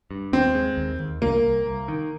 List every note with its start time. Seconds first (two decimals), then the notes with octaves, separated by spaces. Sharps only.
0.11 G2
0.32 D#2 C4
0.55 G#3
0.77 D#2
0.99 D#2
1.21 C2 A#3
1.44 C2
1.66 C2
1.88 D#3